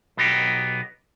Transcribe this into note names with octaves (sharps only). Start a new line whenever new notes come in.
B1 B2 B3 D#4 G4